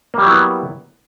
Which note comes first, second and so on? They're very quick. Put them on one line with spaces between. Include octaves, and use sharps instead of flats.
A#3 G3 F#3 E4 B3